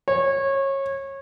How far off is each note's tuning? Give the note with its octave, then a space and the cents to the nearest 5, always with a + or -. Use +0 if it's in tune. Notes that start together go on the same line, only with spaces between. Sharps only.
C#5 -25